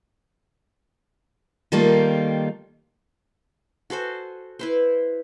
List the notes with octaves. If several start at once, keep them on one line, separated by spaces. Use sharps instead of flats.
D#3 G3 A3 A#3 D#4 F4
F#4 A4 C5 G#5
E4 B4 C5